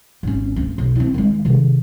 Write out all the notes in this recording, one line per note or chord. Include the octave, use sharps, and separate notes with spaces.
G#1 C#4
D2 C4
B1
C4 E4
D#3 G#3
C3 D#3